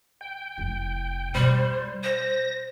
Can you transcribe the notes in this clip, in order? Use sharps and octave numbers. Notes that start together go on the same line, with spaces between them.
G5
F1 E4
B2 G3 C5
C5 A#6